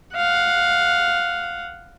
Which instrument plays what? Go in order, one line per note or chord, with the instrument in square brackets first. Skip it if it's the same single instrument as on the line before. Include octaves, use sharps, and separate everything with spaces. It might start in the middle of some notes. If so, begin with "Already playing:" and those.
[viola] F5 F#5